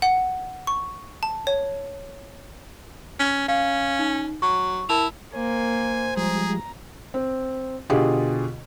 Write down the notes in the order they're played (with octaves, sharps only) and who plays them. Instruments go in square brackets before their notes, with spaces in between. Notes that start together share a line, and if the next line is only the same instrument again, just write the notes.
[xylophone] F#5
C#6
A5
C#5
[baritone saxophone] C#4
[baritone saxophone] C#4 [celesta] F5
[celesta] D#4
[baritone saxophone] F#3 [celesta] C#6
[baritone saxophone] E4 [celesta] A#4 A5 F7
[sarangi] A#3 [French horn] C5 [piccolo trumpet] G#5
[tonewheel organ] F3 G3 G#3 [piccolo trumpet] G#4 [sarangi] A#5
[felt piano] C4
B2 D3 F4 G4 G#4